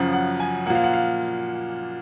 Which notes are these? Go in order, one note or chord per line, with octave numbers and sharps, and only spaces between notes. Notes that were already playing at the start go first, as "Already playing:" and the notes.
Already playing: F#2 C#3 F3 F#5
F#5
G#5
A#2 F3 A#3 F#5
F5
F#5
F5